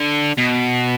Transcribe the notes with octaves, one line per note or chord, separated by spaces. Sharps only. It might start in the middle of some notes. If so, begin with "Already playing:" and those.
Already playing: D3
B2